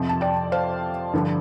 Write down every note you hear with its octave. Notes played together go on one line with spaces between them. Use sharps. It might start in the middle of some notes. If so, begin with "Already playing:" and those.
Already playing: F2 C3 F3
A5
D5 G5
C5 F5
G2 D3 F3